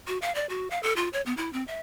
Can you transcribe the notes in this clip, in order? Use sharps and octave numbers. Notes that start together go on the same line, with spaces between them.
F#4
F5
D5
F#4
F5
A4
F4
C#5
B3
E4
C4
E5